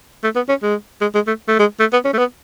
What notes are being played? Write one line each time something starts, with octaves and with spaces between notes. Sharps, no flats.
A3
B3
C#4
G#3
G#3
G#3
A3
A3
G#3
A3
B3
C#4
A3
B3